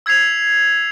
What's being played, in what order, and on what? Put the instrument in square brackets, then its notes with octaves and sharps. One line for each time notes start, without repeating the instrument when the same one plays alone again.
[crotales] E6 G#6 B6 C7 F7